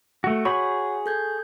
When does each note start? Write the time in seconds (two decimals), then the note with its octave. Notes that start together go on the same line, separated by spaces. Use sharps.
0.24 A3 F#4
0.45 F#4 G#4 C#5 F#5 B5 C#6
1.06 A4 G6 G#6